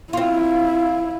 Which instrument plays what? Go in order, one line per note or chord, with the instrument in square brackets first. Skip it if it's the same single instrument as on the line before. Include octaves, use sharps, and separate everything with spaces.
[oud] C4 F4 [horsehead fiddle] E4 [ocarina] F5